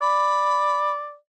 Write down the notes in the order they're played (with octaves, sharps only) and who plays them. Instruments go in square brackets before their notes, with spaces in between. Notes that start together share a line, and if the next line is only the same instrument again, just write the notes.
[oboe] D5 [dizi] B5